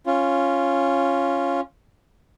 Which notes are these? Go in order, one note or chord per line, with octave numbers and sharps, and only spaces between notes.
C#4 F4